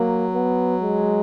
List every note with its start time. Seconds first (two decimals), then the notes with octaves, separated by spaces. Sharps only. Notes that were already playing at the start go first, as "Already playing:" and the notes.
Already playing: F#3 A#3
0.34 B3
0.82 G#3